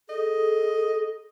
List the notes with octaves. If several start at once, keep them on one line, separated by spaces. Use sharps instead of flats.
G#4 A4 D#5